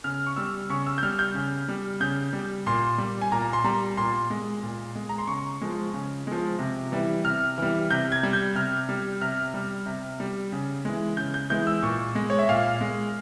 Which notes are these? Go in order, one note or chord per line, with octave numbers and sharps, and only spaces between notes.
C#3 F6
C#6
G3 E6
C#3 C#6
E6
G6
G3 F6
G6
C#3
G3
C#3 G6
G3
A#2 C6
G3
G#5
A#2 A#5
C6
G3 A#5
A#2 C6
G#3
A#2
G#3
A#5
C6
C#3 C#6
F3 G#3
C#3
F3 G#3
C3
E3 G3
C3 F6
E3 G3
C3 G6
G#6
G3
G6
C3 F6
G3
C3 F6
G3
C3
G3
C#3
E3 G#3
C#3 G6
G6
E3 G#3 G6
E6
A#2 C#6
G#3
C#5
E5
A#2 F5
G#3